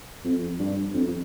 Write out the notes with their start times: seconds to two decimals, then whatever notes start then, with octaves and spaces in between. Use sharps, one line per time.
0.24 F2
0.59 G2
0.93 F2